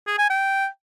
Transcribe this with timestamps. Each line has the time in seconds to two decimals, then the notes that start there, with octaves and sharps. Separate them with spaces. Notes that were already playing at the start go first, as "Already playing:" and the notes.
0.07 G#4
0.18 G#5
0.30 G5